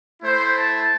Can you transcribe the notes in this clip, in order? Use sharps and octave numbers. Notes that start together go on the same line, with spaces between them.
A3 E4 C5
A5